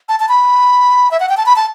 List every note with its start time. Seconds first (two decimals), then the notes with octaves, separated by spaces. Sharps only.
0.09 A5
0.20 A5
0.29 B5
1.11 E5
1.20 F#5
1.29 G5
1.37 A5
1.46 B5
1.56 A5